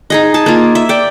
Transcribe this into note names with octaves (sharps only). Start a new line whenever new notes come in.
D#4 G#4 D#5
G#4 A5
A#3 F4
E5
D5 G5